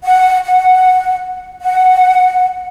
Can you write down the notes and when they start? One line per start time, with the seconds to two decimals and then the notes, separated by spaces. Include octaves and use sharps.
0.04 F#5
0.45 F#5
1.61 F#5